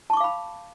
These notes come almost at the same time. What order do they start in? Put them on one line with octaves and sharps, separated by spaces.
A5 C#6 D6 F5 B5